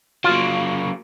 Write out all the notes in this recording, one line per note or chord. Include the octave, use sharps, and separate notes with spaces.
F#3 A#3 F4